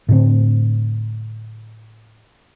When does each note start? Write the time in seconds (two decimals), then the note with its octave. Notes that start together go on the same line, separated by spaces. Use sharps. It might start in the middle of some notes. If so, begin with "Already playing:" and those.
0.09 A2 D3 C4